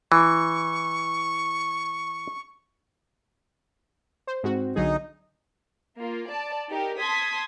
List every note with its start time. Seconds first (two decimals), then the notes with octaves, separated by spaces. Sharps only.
0.12 E3 C#6
4.27 C5
4.43 G#2 C4 F#4
4.76 B1 D3 F#3 D#4 G#4
5.99 A#3 F4
6.29 D5 A5
6.68 D#4 G4 A#4
6.98 A5 C6 D#6 G#6 B6